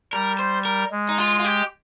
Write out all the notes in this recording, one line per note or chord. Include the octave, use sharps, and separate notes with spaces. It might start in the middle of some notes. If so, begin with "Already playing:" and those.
G3 A#4
C5
A#4
G#3
D#4
F4
F4
G4